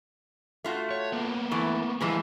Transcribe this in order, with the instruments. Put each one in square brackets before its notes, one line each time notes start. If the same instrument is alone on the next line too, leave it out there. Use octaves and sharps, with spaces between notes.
[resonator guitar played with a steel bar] A3 F4 F#4
[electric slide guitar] C#5
A#3 B3
[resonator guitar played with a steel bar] E3 A3
[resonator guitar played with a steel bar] A#2 E3 F3 [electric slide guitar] G3 A3 G#4